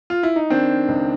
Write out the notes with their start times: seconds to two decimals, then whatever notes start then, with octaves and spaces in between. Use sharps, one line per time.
0.10 F4
0.23 E4
0.36 D#4
0.50 D#3 C4 D4
0.88 C#2